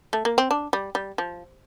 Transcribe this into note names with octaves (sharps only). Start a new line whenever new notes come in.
A3
A#3
C4
D4
G3
G3
F3